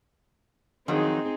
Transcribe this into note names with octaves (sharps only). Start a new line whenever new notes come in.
F2 D#3 F#3 C4 D#4 G#4